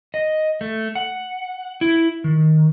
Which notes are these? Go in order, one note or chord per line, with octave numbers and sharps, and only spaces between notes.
D#5
A3
F#5
E4
D#3